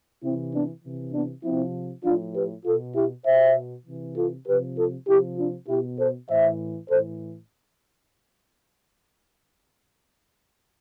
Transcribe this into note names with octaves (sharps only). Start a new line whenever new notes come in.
C3 E3 C4 E4
B3 D4
C3 E3
B3 D4
C3 F3 C4 E4
A2 F3 D4 F4
G4 B4
B2 F4 A4
E4 G4
B2 C5 E5
C3 E3
F4 A4
C3 F3 G4 B4
F4 A4
C3 F3 E4 G4
D4 F4
B2 E4 G4
A4 C5
A2 E3 C5 E5
A2 E3 A4 C5